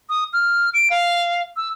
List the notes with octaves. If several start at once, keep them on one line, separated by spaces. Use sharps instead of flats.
D#6
F6
D7
F5
E6